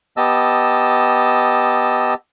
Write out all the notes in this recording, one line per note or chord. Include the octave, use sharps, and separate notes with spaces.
B3 G4 D#5 A5 E6